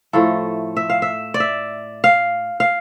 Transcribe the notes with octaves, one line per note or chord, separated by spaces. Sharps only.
A2 F3 A3 A4
E5
F5
E5
D5
E5
F5
F5